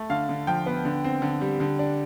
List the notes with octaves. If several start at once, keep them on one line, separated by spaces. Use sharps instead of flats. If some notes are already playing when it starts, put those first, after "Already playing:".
Already playing: A3
D3 F5
D3
F3 G5
B3
D3
C4
D3
G3
D3
D4